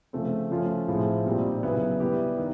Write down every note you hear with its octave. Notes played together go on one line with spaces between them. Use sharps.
C#3 F3 A3 C4
F3 A3 C#4 F4
A2 F3 G#3 C4 E4
A#2 G3 C4 D#4 G4
C#3 F#3 B3 E4
G3 B3 E4 G4
D#3